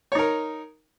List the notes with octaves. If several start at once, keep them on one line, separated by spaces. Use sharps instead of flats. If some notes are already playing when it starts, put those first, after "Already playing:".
D#4 A#4 C#5